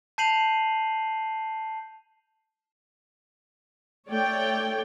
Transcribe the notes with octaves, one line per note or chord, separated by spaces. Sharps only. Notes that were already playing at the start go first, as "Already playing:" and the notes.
A5 G6 C7 D#7 F7 F#7
A3 C#5 D5 G5